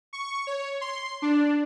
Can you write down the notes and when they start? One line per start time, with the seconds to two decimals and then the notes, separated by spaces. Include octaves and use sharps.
0.13 C#6
0.47 C#5
0.81 C6
1.22 D4